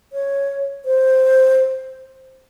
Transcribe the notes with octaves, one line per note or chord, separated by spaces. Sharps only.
C#5
C5